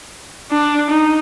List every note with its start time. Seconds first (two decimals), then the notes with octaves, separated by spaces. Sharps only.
0.51 D4
0.90 D#4